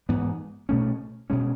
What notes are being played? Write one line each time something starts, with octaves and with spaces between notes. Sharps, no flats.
G#2 E3 B3
B2 A3 C#4
B2 G#3 C#4